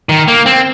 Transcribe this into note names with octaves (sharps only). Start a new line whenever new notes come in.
D#3
A#3
C4